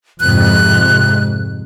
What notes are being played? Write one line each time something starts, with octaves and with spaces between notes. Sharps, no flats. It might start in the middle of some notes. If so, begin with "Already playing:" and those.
F2 G#2 C3 F#6